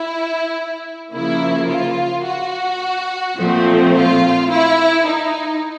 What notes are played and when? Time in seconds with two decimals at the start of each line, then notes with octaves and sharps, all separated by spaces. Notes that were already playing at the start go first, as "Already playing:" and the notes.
Already playing: E4
1.13 C#3 F3 A#3 E4
1.69 F4
2.26 F#4
3.37 A#2 F3 A3 C4
3.93 F4
4.49 E4
5.05 D#4